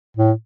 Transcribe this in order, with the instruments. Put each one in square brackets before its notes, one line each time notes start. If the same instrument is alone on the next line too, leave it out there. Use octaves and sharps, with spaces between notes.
[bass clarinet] A2